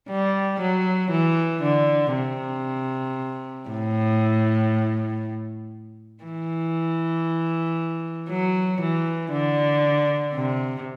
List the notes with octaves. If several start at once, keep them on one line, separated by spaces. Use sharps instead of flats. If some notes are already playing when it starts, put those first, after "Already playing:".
G3
F#3
E3
D3
C3
A2
E3
F#3
E3
D3
C3